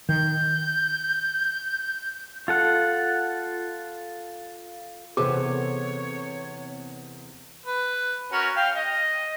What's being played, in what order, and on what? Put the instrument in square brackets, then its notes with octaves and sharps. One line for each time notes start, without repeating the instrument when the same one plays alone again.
[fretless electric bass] D#3 [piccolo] G6
[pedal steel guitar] F4 A4 F#5
[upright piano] E2 C5 [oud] C3 B3 A4 [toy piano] G#4 [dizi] C#5
[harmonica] B4
C#4 F#4 A#4
F5 G5
D#5